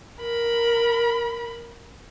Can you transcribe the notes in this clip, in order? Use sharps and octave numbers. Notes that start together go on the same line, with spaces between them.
A#4 B5